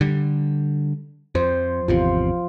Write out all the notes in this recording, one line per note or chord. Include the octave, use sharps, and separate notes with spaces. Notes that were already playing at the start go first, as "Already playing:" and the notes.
D3 G3
F2 F3 C5
G#1 E2 C3 F4